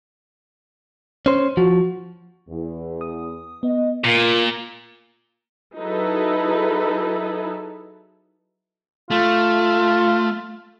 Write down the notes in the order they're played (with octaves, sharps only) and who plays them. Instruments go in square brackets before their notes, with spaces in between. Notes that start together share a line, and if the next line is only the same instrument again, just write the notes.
[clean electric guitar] C#4 C5
[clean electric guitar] F3 [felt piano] F#4
[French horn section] E2
[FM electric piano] D#6
[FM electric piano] B3 [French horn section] D#5
[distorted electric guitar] A#2 [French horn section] A#3 F4
[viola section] F#3 D#4 E4 G#4 A4 B4
[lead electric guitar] A3 [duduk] F4